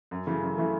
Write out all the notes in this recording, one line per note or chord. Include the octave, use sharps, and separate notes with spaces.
F#2
C#3 E3 A3 E4
F#2
C#3 E3 A3 E4